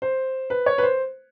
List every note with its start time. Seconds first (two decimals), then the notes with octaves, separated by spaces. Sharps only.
0.02 C5
0.50 B4
0.66 C#5
0.78 B4
0.83 C5